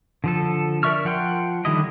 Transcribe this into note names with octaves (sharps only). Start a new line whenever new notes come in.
D3 F3 A4
A#4 D5 E5 C#6 F6
F3 F#5 G5 C6
D3 D#3 G3 E4 D#5